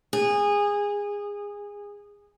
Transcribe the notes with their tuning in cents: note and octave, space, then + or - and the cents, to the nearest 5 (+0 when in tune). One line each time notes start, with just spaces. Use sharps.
G#4 -20